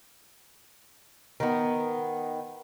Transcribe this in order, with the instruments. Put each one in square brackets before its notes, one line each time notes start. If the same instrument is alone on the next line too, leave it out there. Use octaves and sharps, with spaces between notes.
[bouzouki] D#3 B3